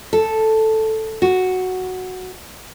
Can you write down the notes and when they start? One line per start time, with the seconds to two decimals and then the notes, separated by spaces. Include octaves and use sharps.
0.13 A4
1.22 F#4